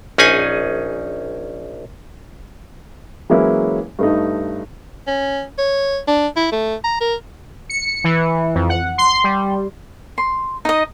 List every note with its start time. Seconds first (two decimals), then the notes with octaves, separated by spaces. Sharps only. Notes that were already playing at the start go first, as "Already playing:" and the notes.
0.18 A#1 C#4 D#4 G#4 G#5
3.30 E3 F#3 G#3 A#3 C#4 E4
3.99 G2 A3 D#4
5.07 C#4
5.58 C#5
6.08 D4
6.36 E4
6.52 A3
6.84 A#5
7.01 A#4
7.70 C#7
8.04 E3
8.55 F2
8.69 F#5
8.98 C6
9.24 G3
10.18 C6
10.65 D#4 D#5